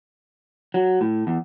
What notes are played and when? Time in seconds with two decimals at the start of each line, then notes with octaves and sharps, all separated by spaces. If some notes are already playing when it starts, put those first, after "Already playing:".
0.74 F#3
1.01 A2
1.27 E2